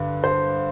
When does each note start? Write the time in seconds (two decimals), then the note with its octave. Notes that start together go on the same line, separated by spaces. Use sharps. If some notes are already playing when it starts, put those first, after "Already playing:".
Already playing: G2 D3
0.24 C5